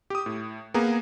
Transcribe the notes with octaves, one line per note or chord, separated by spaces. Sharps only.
G4 D#6
A2
A#3 B3 G#4 A#5